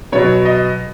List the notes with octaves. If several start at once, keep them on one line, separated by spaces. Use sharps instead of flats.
B2 F#3 B3 C#5
D#5